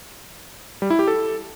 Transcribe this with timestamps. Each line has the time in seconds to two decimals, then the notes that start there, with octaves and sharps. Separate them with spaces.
0.82 G3
0.90 E4
0.99 G4
1.08 A4